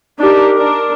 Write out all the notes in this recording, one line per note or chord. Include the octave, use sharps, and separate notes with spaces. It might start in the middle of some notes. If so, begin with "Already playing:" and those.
D4 D#4 G4 A#4
D4 A#4